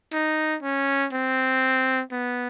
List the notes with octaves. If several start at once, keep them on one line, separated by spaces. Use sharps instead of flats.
D#4
C#4
C4
B3